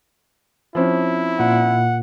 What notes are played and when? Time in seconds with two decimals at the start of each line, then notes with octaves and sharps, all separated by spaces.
0.75 F3 C4 C#4 E4
1.40 A#2 F#5